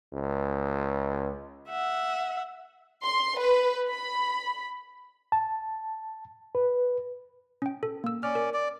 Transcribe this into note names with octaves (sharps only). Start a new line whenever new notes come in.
C#2
E5 F#5
C6
B4
B5
A5
B4
C#4 G5
A4
A#3 E6
C#4 D5 F6
A#4
D5